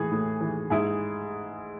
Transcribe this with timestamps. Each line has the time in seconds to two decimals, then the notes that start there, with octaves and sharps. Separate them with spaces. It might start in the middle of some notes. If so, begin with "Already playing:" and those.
Already playing: A2 E3 G#4
0.12 A2
0.41 E3
0.70 G#2 E4 G#4